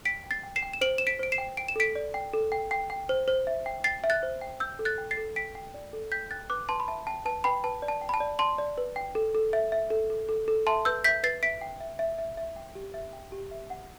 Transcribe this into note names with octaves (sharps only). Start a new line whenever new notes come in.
G5 B6 D7
G5
A6 C7
G5
C7 E7
G5
E7
C5 D7 F#7
C5 E7
B6 D7
C5 D7
C7 E7
G5
G5 D7
E7
A4 B6 D7
D5
G5
A4
G5
G5
G5
C5
C5
E5
G5
G5 A6 C7
E5
F#6 A6
C5
G5
G5 E6 G6
A4
F#6 A6
G5
A6 C7
A4
G5 B6 D7
G5
D5
A4
G5 G6 B6
G5 F#6 A6
B4 D6 F#6
B4 A5 C6
B5
E5 A5
G5 A5
B4 A5
B4 G5 B5
B4 A5
D5
A5
G5
B5
A5
D5
D5 A5 C6
D5
B4
G5
A4
A4
E5
E5
A4
A4
A4
A4
E5 A5 C6
B4 E6 G6
E5 G6 B6
B4 A6 C7
E5 B6 D7
G5
E5
E5
E5
E5
G5
G4
E5
G5
G4
E5
F#5